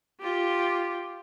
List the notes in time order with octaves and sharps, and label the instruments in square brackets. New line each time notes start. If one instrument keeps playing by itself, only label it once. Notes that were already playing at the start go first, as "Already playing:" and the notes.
[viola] F4 G4